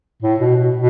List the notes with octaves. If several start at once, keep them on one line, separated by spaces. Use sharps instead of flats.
A2
B2
B2
B2